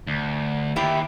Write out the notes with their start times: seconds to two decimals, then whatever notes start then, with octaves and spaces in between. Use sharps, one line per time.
0.07 D2
0.76 D#2 E4 G4 E5